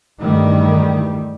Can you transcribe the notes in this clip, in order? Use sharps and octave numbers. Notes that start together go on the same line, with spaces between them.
E2 G2 D#3 E3 G3 A3